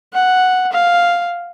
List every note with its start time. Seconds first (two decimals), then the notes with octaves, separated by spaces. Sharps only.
0.14 F#5
0.73 F5